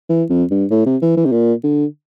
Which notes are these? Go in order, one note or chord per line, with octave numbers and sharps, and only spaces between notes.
E3
F2
G2
A2
C3
E3
E3
C3
A#2
D3